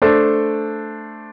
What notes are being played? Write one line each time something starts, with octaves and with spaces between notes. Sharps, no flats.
A3 D4 A4 C5